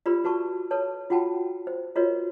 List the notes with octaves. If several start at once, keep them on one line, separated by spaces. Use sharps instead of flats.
F4 G4 B4 D5 B5 E6
F#4 B4 A5 C#6
A4 B4 C#5 A5
F4 F#4 F#5 G5 A5 B5
C5
F4 F#4 A#4 B4 C#5 D#5